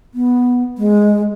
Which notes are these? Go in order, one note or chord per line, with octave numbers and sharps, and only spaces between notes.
B3
G#3